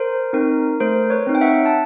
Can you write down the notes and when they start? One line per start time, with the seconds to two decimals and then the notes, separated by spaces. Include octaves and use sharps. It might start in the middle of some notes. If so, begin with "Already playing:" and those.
Already playing: A#4 C5
0.33 C4 D#4 A#4
0.80 A3 A#4 C5
1.10 B4 C#5
1.27 C4 D#4
1.35 G5
1.41 E5 F#5
1.66 A5